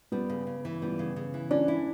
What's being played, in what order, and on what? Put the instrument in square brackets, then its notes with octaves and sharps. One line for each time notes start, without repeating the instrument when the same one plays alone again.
[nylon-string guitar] G3 [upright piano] B3
[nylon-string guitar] C#3
C#3
E3
[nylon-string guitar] G3 [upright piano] B3
[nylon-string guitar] C#3
C#3
E3
[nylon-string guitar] C#4 [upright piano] D4
[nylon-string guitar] E4